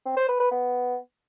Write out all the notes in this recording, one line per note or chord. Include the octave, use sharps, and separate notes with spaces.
C4
C5
B4
B4
B3